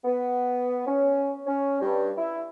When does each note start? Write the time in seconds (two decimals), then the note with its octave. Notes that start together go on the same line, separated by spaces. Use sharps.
0.05 B3
0.87 C#4
1.46 C#4
1.81 G2
2.18 E4